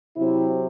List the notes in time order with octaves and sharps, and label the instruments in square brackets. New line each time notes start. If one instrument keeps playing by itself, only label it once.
[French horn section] C3 F#3 C4 E4